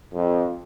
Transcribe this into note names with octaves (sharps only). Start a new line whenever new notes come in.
F2